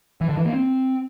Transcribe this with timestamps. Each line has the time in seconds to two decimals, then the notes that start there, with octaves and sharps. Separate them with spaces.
0.21 E3
0.29 D3
0.37 E3
0.45 A#3
0.53 C4